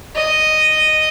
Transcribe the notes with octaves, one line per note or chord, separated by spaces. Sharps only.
D#5